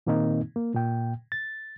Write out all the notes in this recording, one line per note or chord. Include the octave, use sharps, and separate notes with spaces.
A#2 D#3 A#3 C4 D#4
A#3
A#2 G5
A6